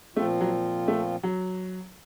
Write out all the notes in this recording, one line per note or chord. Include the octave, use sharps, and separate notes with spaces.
A#2 F3 A3 C4 F4
F#3
A3
F#3